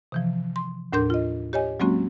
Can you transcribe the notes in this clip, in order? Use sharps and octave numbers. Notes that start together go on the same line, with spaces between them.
C3 E3 F3
C6
D#2 A2 D4 A#4 C6 G6
F4 D#5
G4 C#5 D#5 G#5
F#3 G#3 A#3 C4 C#4 F#4